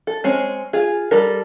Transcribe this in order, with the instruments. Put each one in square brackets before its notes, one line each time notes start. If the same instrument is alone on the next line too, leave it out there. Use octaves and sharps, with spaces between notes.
[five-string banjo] A4
G#3 C4 C#4
F4 G#4
G3 A4 A#4